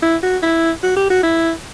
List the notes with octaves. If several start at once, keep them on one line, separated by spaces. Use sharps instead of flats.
E4
F#4
E4
F#4
G4
F#4
E4